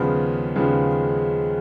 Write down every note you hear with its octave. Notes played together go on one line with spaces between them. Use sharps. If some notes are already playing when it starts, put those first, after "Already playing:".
Already playing: D#2 C#3 F3 G#3 B3
D#2 C#3 F3 G#3 B3